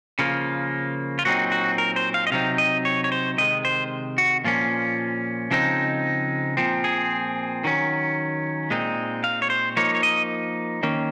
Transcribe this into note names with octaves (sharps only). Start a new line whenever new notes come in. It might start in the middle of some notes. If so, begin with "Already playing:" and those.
C#3 F3 A#3 F4
F4
A#2 F#3 C4 D#4 F#4
F#4
A#4
C5
F5
D#5
C3 F#3 C4 D#4 F5
D#5
C#5
C#5
C5
C3 D#3 G#3 D#5
C5
F#4
A#2 F3 A#3 C#4 F4
C#3 F3 G#3 C4 D#4
A#2 F3 C4
G#4
D#3 F#3 C#4
A#2 G#3 C4 D#4
F5
C#5
C5
F3 A#3 D#4 C#5
C#5
D#5
D#3 A#3 C#4